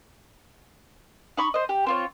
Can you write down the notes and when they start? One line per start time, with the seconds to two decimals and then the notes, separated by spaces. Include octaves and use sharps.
1.37 D#4 B5 C#6
1.54 C5 D#5
1.69 G4
1.86 C4 F4 C#5